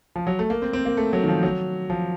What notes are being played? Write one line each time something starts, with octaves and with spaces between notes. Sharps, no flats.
F3
F#3
A3
A#3
C4
C4
A#3
A3
F#3
D#3
F3
F#3
F3